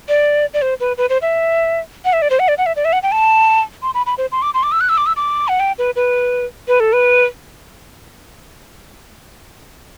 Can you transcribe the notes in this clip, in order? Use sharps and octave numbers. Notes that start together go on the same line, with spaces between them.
D5
D5
C5
B4
B4
C5
E5
F#5
E5
D5
C5
F#5
D5
F#5
E5
D5
E5
F#5
G5
A5
C6
B5
B5
C5
C6
D6
C6
D6
E6
F#6
E6
D6
E6
D6
F#5
G5
B4
B4
B4
A4
B4